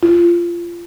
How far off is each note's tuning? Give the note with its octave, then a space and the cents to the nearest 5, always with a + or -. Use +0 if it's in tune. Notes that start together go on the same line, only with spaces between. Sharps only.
F4 -20